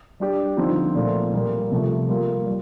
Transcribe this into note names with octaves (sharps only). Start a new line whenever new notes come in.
G3 D4 G4
D3 F3 C4 D#4
A#2 F3 A3 C4 F4
A#2 G3 A#3
C3 F3 A3
G3 A#3 F4
G3